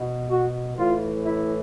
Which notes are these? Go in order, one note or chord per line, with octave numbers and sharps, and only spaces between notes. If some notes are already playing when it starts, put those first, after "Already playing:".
Already playing: B2
F#4
A2 E3 F4
E4